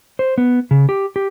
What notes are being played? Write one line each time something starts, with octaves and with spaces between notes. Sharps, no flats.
C5
B3
C#3
G4
G4